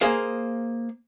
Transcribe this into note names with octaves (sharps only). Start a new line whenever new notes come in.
A#3 G#4 C5 F5